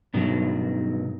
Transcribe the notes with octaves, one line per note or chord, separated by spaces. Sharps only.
G2 B2 D#3 F#3